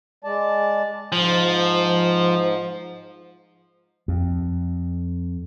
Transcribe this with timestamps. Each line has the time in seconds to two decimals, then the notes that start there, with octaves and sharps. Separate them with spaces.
0.24 G#3 D5 A5
1.12 G#2 F3
4.08 F2